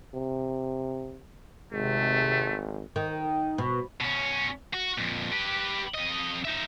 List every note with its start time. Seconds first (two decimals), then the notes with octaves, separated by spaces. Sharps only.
0.14 C3
1.73 G#1 C3 G#3 A3
2.96 D#3
3.58 B2
4.01 B2 C#4
4.73 F#4
4.98 F2 A#2
5.32 G4 B4
5.95 F2 D#5
6.45 D#4 E5